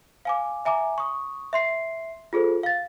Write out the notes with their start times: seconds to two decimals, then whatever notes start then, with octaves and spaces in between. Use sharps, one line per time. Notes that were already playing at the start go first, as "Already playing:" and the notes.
0.25 F5 G#5 D6
0.65 E5 G#5 A#5 D6
0.98 C#6 D#6
1.53 E5 C6 C7
2.33 F4 G#4 A4 C5
2.63 F5 A6